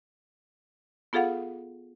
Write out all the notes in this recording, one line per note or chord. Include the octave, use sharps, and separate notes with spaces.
B3 F4 G#4 A4 F5 F#5